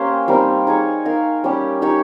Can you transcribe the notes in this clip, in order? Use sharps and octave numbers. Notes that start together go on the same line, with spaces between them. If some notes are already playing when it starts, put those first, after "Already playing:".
Already playing: A#3 C#4 G4 C5
G3 C4 D#4 A#4
D#4 G#4 C#5
D#4 A#4 F5
G3 C#4 G4
D#4 G4 C#5